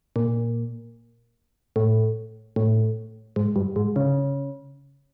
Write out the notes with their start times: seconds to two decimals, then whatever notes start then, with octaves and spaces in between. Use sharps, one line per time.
0.16 A#2
1.76 A2
2.56 A2
3.36 G#2
3.56 G2
3.76 G#2
3.96 C#3